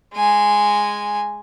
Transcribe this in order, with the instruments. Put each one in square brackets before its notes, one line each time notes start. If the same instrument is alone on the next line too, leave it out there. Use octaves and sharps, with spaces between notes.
[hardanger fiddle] G#3 G#5